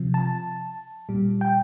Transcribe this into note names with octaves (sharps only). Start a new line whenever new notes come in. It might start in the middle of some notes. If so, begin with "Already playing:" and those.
Already playing: C3 F3
A5
A#2 G3
G5